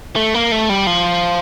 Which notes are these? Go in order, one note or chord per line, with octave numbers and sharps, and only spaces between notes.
A3
A#3
A3
G3
F3